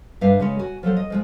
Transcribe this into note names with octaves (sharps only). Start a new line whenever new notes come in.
G2 D4 B4 E5 F5
C#3 G#3 C#4 C#5
F#4 G#5
F3 F#3 A4 C5
D#5
F3 G#3 F4